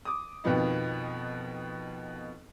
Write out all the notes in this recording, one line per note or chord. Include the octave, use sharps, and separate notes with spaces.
D6 D#6
F2 B2 D#3 F3 B3 D#4